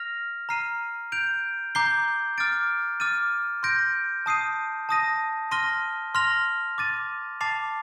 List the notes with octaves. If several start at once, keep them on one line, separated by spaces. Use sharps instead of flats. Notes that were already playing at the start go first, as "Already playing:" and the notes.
Already playing: F6 A#6 F7
A#5 F6 C7 D#7
G6 D7 F7
A#5 D6 G6 C7 G7
D6 F6 A6 D7
D6 F6 A6 D#7
C6 G6 A#6 D7
A5 D#6 G6 C7 D#7
A5 D#6 A#6 D#7
C6 F6 A#6 D#7 G7
C6 F6 A#6 F7
D6 A6 D#7
A5 D6 A6 C7 F7